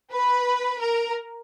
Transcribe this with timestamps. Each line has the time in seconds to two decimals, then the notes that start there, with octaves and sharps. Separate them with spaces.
0.11 B4
0.80 A#4